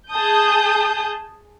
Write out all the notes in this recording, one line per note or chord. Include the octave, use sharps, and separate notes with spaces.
G#4 A5 D#6 G6